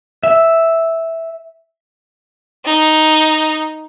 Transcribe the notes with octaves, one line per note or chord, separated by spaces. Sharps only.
E5
D#4